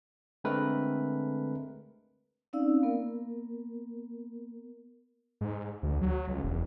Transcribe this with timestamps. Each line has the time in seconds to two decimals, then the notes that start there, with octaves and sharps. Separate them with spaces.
0.44 D3 G#3 A3 C4 A#4 B4
2.53 C4 C#4 D#4 D5 F5 E6
2.82 A#3 B3 A#4
5.41 G#2
5.83 D2
6.02 F#3
6.28 C#2
6.44 E1